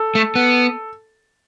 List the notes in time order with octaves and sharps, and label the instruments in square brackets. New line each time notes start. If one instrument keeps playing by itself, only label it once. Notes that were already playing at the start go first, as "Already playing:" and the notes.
Already playing: [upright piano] A4
[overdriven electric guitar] A3
B3